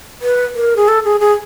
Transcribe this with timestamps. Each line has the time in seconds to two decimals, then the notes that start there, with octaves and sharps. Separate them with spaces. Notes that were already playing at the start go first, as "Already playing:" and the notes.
0.22 B4
0.55 A#4
0.76 G#4
0.88 A4
1.05 G#4
1.20 G#4